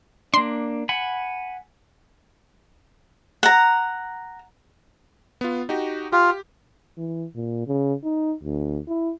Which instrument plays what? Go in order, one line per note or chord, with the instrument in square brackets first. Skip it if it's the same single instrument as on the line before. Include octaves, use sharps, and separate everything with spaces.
[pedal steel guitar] A#3 D4 [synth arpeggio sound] C6
[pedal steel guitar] F#5 G#5 B5
[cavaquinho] F#5 A#5
[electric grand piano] B3 F4
D#4 F#4 G4
[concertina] F4 [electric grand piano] G4
[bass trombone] E3
A#2
C#3
D#4
D2
E4